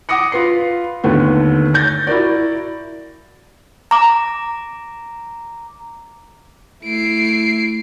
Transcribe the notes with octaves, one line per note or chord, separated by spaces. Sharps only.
F#5 D6 D#6 A#6 C#7
F4 B4 C7
D#2 D3 A3 B3
G6 A6 A#6
E4 F#4 A#4 D5
A#5 D6
A3 E4 C7 D7